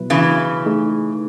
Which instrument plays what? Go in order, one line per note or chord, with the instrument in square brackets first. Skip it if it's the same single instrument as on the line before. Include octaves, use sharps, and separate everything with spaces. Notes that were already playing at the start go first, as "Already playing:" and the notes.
Already playing: [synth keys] B2 F#3 B3 E4 B4
[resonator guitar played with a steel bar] C#3 E3
[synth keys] A3 D#4 G#4